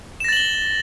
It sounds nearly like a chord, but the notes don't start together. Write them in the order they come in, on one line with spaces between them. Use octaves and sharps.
E7 A#6 A6 F#7 G7